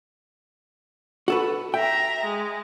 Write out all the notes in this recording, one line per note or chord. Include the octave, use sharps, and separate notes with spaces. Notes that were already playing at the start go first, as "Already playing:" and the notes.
F#4 A4 B4
E5 G5 A#5
G#3